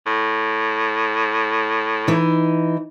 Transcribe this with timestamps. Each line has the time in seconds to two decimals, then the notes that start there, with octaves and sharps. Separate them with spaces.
0.06 A2
2.07 E3 D#4